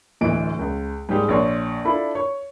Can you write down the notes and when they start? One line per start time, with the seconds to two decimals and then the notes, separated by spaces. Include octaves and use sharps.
0.21 D1 D2 E3 D#5 D7
0.59 C#2
1.09 G#2 G3 C4 G4 G#4
1.28 A#1 C#5 C6
1.85 D4 E4 F4 A4 B5
2.15 C#5